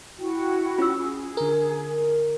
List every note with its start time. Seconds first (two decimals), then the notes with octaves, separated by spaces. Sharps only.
0.17 E4 F#4 G5
0.78 C#4 F4 E6
0.97 G#4
1.37 D3 A#4